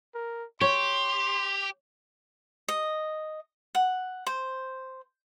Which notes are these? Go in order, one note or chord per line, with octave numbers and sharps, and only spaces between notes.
A#4
G4 C#5 C6
D#5
F#5
C5